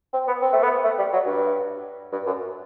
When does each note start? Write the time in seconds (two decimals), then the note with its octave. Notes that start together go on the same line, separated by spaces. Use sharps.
0.13 C4
0.27 B3
0.41 C4
0.53 A3
0.63 B3
0.84 A3
0.99 G3
1.13 F#3
1.26 G2
2.12 G2
2.26 F#2